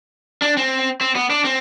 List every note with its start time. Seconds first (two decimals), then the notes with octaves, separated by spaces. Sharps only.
0.42 D4
0.57 C4
1.01 C4
1.15 B3
1.30 D4
1.45 C4